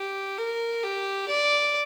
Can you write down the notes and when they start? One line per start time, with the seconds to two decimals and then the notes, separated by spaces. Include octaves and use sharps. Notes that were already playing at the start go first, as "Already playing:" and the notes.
Already playing: G4
0.38 A#4
0.83 G4
1.28 D5